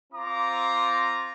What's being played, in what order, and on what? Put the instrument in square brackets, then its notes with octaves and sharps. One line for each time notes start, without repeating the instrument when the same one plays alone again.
[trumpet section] C4 F4 A#5 D6